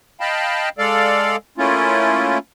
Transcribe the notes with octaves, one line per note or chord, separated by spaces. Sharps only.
D#5 F5 G5 A5 B5
G#3 A4 D5 F5
A3 A#3 C#4 E4 F4